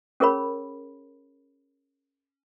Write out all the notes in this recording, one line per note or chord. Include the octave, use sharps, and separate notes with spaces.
C#4 G#4 A#4 C#5 B5